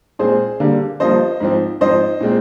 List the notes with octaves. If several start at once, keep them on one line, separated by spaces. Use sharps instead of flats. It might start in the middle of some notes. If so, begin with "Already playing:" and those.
A#2 G#3 C4 G#4 C5
D3 G3 A#3
G2 F3 A#3 C5 D#5
G#2 F3 C4
G#2 F3 C4 C5 D#5
A#2 G#3 C4